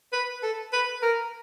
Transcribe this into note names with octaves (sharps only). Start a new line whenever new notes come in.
B4
A4
B4
A#4